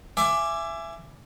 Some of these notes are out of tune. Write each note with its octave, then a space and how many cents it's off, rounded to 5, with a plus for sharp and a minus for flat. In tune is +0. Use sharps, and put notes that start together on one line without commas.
E5 +25 G#5 +0 D6 +0